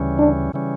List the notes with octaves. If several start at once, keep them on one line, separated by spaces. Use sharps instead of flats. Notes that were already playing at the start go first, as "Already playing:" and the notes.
Already playing: D2 C#3 E3 G3 C#4
D4
C#3 E3 G3 C#4